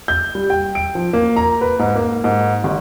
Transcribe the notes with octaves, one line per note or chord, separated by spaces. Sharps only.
G6
G3
G5
D7
F3
A#3
A#5
B4
G#2
A#3
G#2
G#1